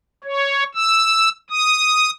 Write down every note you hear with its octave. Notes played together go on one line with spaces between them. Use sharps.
C#5
E6
D#6